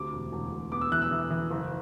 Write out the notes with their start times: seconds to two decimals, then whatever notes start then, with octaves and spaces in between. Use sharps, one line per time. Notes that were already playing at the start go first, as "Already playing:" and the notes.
Already playing: D2 C3 D6
0.13 E1
0.32 E1
0.52 E1
0.72 B3 D6
0.81 E6
0.91 E3 F#6
1.02 E6
1.11 E3
1.30 E3
1.51 F#1